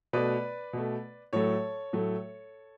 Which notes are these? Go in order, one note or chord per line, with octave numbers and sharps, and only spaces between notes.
B2 A3 B4 D5
B2 A3
A2 F#3 A3 A4 C#5
A2 F#3 A3